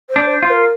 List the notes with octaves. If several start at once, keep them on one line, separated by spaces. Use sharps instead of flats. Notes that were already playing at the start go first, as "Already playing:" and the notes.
C5
D4
C5
F4
A#4